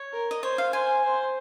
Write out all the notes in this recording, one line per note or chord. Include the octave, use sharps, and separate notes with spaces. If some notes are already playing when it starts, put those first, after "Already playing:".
Already playing: C#5
A#4
D#5
C5 C#5
F5
C5 G#5
C5